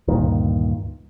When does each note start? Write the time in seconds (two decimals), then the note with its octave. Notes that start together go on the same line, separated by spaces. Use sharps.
0.08 D2 G2 A#2 D#3